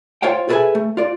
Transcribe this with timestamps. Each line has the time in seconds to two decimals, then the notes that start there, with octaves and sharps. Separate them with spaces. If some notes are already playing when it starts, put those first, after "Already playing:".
0.22 F4 C5 C#5 F5 G5
0.49 G#4 A4 B4 C#5 E5 G#5
0.75 A3
0.97 F4 D5